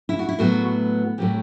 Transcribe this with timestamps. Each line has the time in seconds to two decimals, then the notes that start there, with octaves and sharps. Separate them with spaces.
0.09 E4
0.19 F#4
0.29 E4
0.39 A2 F#3 B3 F#4
1.18 A2 F#3 C4 G4